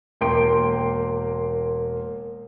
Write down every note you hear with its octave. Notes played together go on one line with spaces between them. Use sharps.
E1 A#3 A#4 G5 C6 D7